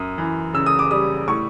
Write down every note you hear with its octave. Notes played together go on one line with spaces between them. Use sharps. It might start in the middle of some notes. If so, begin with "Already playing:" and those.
Already playing: F#2 D#6
E3
C#3 E6
D#6
D6
G3 D#6
A2 C#6